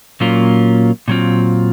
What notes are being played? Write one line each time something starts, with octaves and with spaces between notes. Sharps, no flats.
A#2 F#3 A#3 C#4 F4
A#2 F#3 C4 F4